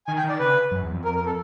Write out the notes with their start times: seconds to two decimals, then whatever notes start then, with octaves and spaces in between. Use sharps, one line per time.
0.07 D#3 G#5
0.18 G5
0.24 D#3
0.29 D5
0.39 C#3 B4
0.71 F#2
0.83 E2
0.94 F2
1.05 A#4
1.15 A#4
1.26 A4